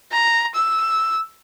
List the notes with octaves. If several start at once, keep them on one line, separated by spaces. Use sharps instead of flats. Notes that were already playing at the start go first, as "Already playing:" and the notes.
A#5
E6